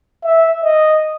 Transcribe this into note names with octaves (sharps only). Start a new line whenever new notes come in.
E5
D#5